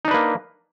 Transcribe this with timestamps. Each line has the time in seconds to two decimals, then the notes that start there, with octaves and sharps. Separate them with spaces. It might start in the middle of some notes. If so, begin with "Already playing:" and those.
0.05 D#4
0.08 D4
0.11 B4
0.14 A#3